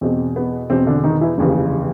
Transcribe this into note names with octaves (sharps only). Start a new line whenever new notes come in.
E2 B2 C4
B3
E2 B2 C4
D3 D4
D#3 D#4
E3 E4
F1 D#2 C#3 E3